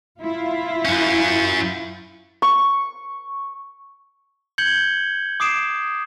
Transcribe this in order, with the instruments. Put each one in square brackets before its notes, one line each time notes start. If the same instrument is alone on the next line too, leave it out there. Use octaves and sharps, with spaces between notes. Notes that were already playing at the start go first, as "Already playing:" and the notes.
[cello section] E4 F4
[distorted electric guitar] F#2 C#4
[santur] C#6
[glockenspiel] G6 G#6 C#7 F#7 G7
D6 D#6 C7 D7 E7